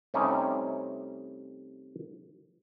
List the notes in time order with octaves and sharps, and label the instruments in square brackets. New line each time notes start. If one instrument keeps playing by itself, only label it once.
[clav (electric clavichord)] C3 G3 A3 C#4 D#4